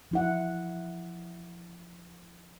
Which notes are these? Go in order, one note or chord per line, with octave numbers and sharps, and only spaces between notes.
F3 E4 F#5